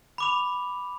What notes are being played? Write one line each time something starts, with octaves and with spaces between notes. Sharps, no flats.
B5 D6 F7